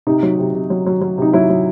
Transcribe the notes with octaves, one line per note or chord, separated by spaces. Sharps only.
C3 D#4
F#3
C3
C3
F#3
F#3
F#3
C3 D#4
F#3 E4
F#3